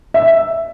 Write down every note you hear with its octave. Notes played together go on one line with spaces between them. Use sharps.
E5